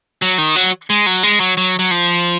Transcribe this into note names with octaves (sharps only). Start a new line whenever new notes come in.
F#3
D#3
F#3
G#3
F#3
G#3
F#3
F#3
F#3
F3